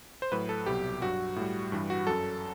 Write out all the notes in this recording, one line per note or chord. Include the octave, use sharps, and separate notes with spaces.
C5
A2 F#3 B4
A4
C2 B2 F#3 G4
G2 F#3 F#4
A2
G3
G2 E3 G3
F#4
F#2 F#3 A4